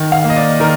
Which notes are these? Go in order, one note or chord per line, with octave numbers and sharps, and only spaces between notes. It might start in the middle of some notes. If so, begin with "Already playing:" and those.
Already playing: D#3
F5
A#3
D#5
D5
D#3 A#4